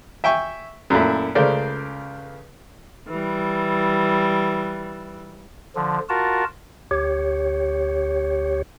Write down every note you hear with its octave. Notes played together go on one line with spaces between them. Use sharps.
E5 G5 G#5 C#6
F#2 A#2 A3 E4
C#2 C#3 A3 A#4 C5 D5
E3 G3
D3 F3
F4 F#4 A#4 A5
D2 G4 C#5